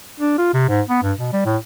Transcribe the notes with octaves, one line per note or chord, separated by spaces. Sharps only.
D4
F4
C3
G#2
B3
G2
B2
G3
A2